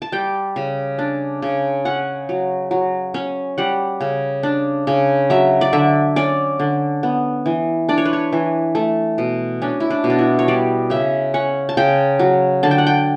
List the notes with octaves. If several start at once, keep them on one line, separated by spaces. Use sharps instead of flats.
A5
G3 G5
C#3
D4
C#3
C#4 F#5
F#3
F#3
C#4
G3 F#5
C#3
D4
C#3
F#3 E5
D5
D3 E5
C#4 D5
D3
B3
E3
D4 D5
C#5
B4
C#5
E3
A3
B2
C#4 D4
E4
D4
B2
D4
E4
C#5
G3 D5
C#3 E5
C#4 F#5
A5
C#3 G5
F#3
D3 A5
G5
F#5
G5